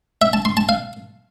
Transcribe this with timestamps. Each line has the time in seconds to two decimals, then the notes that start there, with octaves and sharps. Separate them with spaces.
0.22 E5
0.33 A5
0.45 C6
0.57 A5
0.69 F5